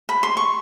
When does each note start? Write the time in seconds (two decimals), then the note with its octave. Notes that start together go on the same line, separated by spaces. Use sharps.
0.09 B5
0.23 C6
0.37 C#6